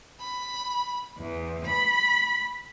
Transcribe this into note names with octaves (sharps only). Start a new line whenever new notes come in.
B5
E2
B5